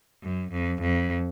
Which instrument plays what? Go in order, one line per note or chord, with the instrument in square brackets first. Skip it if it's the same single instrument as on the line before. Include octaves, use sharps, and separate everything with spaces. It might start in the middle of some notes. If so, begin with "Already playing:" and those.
[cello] F#2
F2
F2